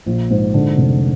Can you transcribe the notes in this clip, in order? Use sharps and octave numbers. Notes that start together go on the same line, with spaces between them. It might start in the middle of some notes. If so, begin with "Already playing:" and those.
A#1
G#2
D3
F1